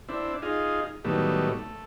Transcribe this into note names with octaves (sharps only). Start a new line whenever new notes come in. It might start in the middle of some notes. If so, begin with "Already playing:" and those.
C4 D4 E4
D#4 F4 G#4
A2 D#3 F#3 G3 A3 B3
A3